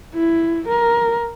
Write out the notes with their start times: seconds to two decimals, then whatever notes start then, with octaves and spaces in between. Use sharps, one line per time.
0.14 E4
0.68 A#4